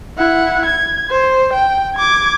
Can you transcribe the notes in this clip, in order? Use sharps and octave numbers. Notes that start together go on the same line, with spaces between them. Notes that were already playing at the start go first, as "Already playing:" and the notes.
E4 F#5
G#6
C5
G5
D6 G#6